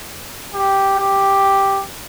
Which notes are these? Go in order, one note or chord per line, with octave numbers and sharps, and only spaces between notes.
G4
G4